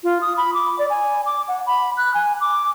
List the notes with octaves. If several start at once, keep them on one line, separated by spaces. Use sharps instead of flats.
F4
D#6
B5
D6
D5
G#5
D6
F#5
B5
F#6
G#5
D6